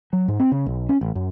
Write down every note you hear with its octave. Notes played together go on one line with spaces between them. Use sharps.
F#3
G#2
C4
C#3
B1
C#4
A1
F#2